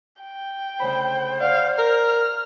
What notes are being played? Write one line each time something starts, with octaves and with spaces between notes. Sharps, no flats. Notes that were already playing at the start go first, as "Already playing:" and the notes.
G5
D2 C#3 C5 B5
D5 F5 F#5 C#6
A#4 F6